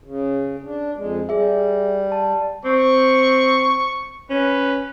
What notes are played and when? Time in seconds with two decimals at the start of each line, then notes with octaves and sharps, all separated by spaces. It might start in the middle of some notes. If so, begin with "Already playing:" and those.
0.04 C#3
0.64 D4
0.96 F2 G#3
1.29 G3 G#4 E5
2.12 A5
2.65 C4 C#6
4.30 C#4 B4